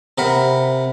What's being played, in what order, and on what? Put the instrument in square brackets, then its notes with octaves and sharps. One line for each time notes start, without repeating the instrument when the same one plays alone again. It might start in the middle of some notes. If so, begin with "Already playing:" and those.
[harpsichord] C3 A#4 F#5 B5